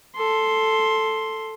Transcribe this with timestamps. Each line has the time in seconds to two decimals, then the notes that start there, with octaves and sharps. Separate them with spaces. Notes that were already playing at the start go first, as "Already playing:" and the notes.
0.17 A4 C6